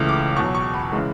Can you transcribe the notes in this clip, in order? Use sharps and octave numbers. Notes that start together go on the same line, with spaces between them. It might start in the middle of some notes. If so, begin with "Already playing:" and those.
Already playing: C#2 C#3 E3 A3
D6
E2 B2 F#3 C#6
C#6
B5
C#3 E3 G#3